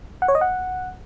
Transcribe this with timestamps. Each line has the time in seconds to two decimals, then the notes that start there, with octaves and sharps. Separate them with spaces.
0.22 F#5
0.28 C#5
0.35 D#5
0.41 F#5